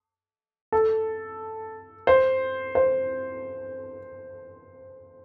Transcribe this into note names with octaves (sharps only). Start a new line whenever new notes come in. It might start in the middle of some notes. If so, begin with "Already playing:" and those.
A4
C5
C5